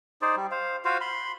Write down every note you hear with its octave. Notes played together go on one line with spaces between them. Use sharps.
D#4 G#4 C5 D5
G3
C5 F5
F4 F#4 C5 F5
B5 C6